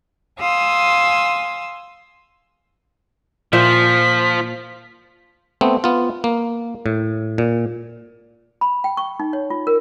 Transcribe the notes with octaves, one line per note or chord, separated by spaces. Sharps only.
F5 G#5 C6 D#6 E6
A#2 F3 C5 E5 B6
A3 B3 C4
B3 F4
A#3
A2
A#2
B5
G5
C#6
D#4
C#5
F4
A#4